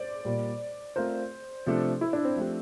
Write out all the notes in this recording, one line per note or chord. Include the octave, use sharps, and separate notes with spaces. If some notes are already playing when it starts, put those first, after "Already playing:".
Already playing: C5 D5
A#2 G3 A#3
A3 C4 F4 A#4 C5
C3 F3 A3 D4 A4
E4
D4
C4
F3 A3 D4 G4